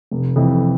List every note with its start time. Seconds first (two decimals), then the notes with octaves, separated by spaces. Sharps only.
0.11 F1
0.36 F2 E3